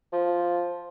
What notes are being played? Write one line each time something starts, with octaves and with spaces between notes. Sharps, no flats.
F3